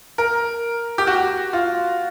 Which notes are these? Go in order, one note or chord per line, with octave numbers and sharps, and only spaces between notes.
A#4
G4
F#4
F4